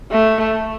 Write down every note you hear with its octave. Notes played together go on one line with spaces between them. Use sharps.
A3